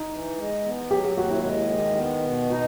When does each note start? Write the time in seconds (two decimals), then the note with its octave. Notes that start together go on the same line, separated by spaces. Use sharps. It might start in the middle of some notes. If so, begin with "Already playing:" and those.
Already playing: D#4
0.11 E3
0.37 G#3
0.65 B3
0.90 F#3 G4
1.04 G4
1.17 D#2 F#4
1.31 E4
1.44 G#3 E4
1.71 D#3
1.96 B3
2.23 B2
2.49 D#4 F#4